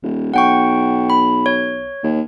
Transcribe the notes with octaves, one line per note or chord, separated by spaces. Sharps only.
D#1
B1 F#5 G5 C#6
B5
C#5
D#2